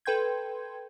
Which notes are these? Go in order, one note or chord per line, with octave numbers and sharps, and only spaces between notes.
A4 B4 G5 C6 G6 G#6